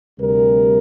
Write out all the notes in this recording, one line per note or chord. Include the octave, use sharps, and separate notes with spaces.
D2 C3 G3 A#4